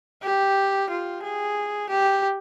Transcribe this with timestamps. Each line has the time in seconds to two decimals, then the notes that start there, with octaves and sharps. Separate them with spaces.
0.23 G4
0.90 F4
1.24 G#4
1.90 G4